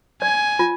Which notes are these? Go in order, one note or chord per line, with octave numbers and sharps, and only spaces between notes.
D5 G#5
F4